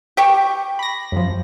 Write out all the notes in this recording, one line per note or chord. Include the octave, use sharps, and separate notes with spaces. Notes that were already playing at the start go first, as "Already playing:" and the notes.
G4 G5 C#6
B5 A#6
F#2 F3